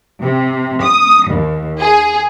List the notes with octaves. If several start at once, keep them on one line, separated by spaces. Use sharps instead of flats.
C3
D#6
D#2
G#4